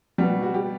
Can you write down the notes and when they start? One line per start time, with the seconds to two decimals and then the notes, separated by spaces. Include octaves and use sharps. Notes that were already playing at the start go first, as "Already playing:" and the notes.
0.18 B2 G3 F#4
0.43 F#4
0.54 G4